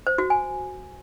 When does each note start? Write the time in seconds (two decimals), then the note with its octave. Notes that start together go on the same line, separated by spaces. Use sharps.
0.07 C5
0.18 F#4
0.30 G#5